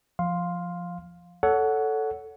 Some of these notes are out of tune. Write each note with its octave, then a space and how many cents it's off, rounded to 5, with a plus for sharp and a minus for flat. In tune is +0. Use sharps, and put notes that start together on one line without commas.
F3 +0 F5 +10 C6 +0
A4 +0 C#5 +30 F#5 +0